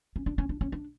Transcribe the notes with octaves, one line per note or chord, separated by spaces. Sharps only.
C#4
D4
C#4
D4
C#4
D4